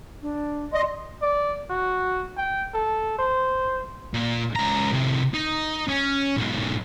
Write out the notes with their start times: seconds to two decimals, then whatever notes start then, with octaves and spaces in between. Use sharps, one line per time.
0.22 D4
0.73 D5 D#5 C6
1.22 D5
1.70 F#4
2.37 G5
2.74 A4
3.19 C5
4.14 A#2
4.55 C#2 A#5
4.92 A2 C3
5.34 D#4
5.88 C#4
6.37 B1 G#2